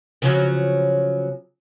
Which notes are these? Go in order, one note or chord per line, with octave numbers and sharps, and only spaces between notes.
C#3 F3 F#3